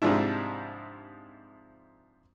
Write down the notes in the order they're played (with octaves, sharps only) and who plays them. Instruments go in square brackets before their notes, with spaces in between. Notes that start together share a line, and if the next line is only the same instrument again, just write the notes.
[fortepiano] G#2 C3 F3 G3 D4 E4